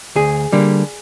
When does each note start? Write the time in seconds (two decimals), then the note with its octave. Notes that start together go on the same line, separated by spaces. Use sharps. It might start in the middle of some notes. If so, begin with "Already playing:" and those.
0.16 D2 G#4
0.53 D3 G3 A#3